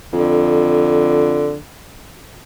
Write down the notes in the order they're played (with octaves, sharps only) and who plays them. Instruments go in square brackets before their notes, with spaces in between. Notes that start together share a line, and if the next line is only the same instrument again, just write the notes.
[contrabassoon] F2 [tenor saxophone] D3